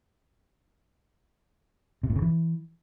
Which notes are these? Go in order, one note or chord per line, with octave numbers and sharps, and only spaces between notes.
C3
A2
C#3
E3